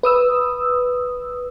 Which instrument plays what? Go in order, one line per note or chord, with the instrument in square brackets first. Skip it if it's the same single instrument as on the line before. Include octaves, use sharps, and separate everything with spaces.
[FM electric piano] B4 D#6 E6